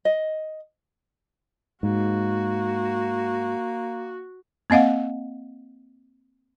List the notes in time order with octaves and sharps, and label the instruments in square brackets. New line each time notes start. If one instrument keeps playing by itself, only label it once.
[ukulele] D#5
[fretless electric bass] G#2 [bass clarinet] A#3 [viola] F#4
[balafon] A#3 C4 D#5 F5 F#5